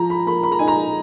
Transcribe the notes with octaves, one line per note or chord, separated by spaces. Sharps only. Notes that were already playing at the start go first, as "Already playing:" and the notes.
Already playing: F3 A#5
B5
A#3 B5
B5
A#5
D#4 G#5
A#5